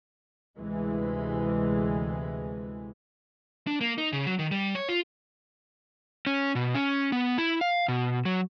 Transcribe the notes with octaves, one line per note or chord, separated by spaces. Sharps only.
D2 C3 E3 G#3
D4
A#3
D#4
C#3
F#3
D#3
G3
C#5
F4
C#4
B2
C#4
B3
E4
F5
B2
F#3